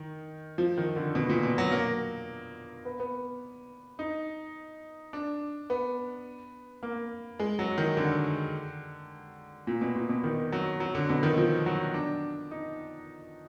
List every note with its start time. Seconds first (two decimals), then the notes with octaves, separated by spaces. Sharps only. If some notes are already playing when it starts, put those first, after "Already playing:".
Already playing: D#3
0.58 F3
0.78 D#3
0.96 D3
1.15 B2
1.29 A#2
1.43 B2
1.58 F#3
1.72 A#3
2.85 B3
3.00 B3
3.99 D#4
5.13 D4
5.70 B3
6.83 A#3
7.40 G#3
7.59 F#3
7.78 D#3
7.97 D3
9.67 A#2
9.81 B2
9.96 A#2
10.09 B2
10.24 D#3
10.52 F#3
10.80 F#3
10.95 D3
11.09 B2
11.23 D#3
11.38 F3
11.66 F#3
11.94 D4
12.51 D#4